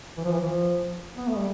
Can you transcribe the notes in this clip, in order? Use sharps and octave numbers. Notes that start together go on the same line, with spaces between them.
E3
F3
E3
F3
B3
A3
G3